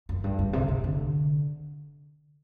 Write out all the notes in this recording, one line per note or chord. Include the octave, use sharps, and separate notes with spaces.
F#2
G2
G2
C3
C3
D3